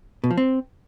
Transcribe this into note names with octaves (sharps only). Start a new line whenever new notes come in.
B2
F3
C4